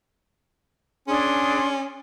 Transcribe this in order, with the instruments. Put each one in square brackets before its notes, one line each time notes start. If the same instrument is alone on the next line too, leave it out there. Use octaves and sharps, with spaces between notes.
[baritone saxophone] C#4 [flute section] D4 G#4 C6